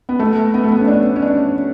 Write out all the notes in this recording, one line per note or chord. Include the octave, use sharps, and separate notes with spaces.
B3
A3
B3
A3
B3
C#4
D4
C#4
D4